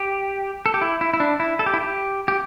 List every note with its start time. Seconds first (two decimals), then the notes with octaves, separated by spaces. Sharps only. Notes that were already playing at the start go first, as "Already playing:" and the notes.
Already playing: G4
0.66 A4
0.74 G4
0.82 E4
1.01 E4
1.14 E4
1.20 D4
1.40 E4
1.59 A4
1.66 G4
1.74 E4
1.80 G4
2.28 G4